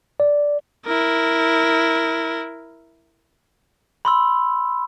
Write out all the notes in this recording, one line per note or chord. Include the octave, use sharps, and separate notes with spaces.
D5
E4 A#4
B5 C6 E6